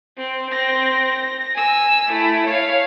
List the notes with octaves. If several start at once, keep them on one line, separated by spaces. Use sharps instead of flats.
C4
C4 A#6
A#6
G#5 E6
A3 E4
C#5 F5